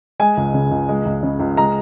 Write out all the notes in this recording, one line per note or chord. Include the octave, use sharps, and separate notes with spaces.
G#3 G#5
C#2
C#3
C#2
G#3
C#2
C#3
C#2
G#3 A#5